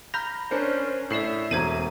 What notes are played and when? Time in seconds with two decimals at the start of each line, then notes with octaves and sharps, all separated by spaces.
0.14 A#5 B5 F6 G6 A#6
0.51 C#4 D4 A#4 C5 C#7
1.11 A2 A4 D5 E5 C7 E7
1.51 E1 A4 C5 A#5 G#6 D#7